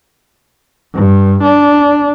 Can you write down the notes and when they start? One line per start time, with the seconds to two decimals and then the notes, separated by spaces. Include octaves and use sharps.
0.95 G2
1.43 D4